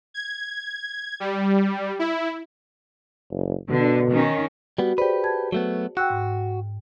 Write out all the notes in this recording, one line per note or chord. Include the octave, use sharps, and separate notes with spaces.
G#6
G3
E4
F#1
B2 D3
D#3 C#4
G3 B3 F#4
G4 G#4 B4 C5 D5
A5 G#6
F#3 A3 B3
F#4 G5 E6 F#6
G#2